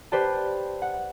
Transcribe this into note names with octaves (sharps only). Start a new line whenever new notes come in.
G4 B4 C5 D5 A5
F#5